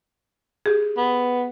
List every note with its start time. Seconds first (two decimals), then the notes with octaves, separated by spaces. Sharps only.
0.66 G4 G#4
0.97 B3